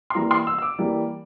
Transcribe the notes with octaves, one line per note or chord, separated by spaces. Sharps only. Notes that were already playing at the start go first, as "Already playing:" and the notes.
C6
E3 G3 A#3 A#5
C6
E6
E6
D6
E3 G3 A#3